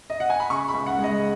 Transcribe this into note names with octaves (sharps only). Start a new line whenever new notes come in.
D#5
F#5
G#5
B5
C#3 C#6
B5
C#2
F#5
G#3
D#5